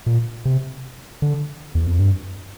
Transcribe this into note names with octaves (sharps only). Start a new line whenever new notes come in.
A#2
C3
D3
E2
F2
G2